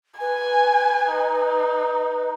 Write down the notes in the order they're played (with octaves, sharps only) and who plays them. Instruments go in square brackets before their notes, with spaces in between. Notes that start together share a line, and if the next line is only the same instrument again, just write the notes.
[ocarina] B4 [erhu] G#5
[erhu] D#4